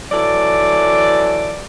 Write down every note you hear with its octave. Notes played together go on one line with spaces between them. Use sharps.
E3 F#3 A4 D5